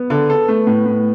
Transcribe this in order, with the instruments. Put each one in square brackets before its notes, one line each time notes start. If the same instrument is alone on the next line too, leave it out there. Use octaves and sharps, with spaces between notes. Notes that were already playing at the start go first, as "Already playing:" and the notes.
Already playing: [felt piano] B3
[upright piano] D3
A4
A3
A2
A2